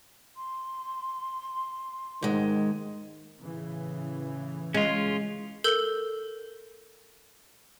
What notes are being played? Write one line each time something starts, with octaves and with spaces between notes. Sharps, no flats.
C6
G#2 D#3 G#3
A2 C#3 E3
G#3 C#4 F4
A4 A#4 E6 G6 G7